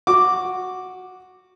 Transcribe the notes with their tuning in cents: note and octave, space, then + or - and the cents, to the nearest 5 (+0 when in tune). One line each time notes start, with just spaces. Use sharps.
F#4 -5 D6 +0